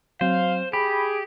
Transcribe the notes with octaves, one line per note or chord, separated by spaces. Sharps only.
F#3 C4 C5 F5
G4 G#4 B5